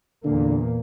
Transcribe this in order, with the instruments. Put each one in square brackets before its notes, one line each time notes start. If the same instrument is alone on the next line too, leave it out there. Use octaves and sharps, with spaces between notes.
[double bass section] E2 A#2 A#3 [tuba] D3